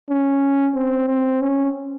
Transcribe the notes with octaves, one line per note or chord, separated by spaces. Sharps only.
C#4
C4
C4
C#4